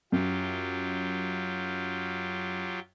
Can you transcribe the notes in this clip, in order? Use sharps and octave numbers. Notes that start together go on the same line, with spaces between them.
F#2 F#3 F4 G4